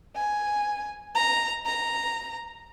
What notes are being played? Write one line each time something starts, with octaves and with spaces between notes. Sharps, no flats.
G#5
A#5
A#5